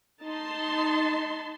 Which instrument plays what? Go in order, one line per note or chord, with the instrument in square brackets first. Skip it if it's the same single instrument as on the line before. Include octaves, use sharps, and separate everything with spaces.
[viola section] D#4 A5 C6